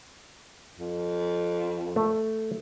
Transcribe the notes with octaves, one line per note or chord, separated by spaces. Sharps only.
F2
A3